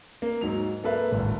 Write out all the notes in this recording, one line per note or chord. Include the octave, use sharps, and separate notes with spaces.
A#3
G#2 F#3 F7
A#3 A4 B4 E5
D1 G#1